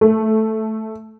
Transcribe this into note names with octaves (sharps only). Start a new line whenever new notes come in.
A3